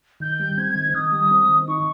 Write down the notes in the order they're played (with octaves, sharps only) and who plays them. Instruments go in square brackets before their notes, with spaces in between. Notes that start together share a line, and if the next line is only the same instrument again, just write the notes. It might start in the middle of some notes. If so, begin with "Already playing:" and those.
[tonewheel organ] D#3 [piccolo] G6
[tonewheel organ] G3
[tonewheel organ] C4 [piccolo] G#6
[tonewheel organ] D#3
[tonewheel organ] D#3 [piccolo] D#6
[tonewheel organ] G3
C4
D#3
[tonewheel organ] D#4 [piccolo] C#6